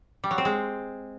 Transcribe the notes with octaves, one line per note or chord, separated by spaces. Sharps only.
G3
F#3
C4
G#3